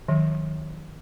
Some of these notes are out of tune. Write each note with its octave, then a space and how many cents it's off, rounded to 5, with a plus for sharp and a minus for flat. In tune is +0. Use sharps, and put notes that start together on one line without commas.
D#3 +0 F#3 -30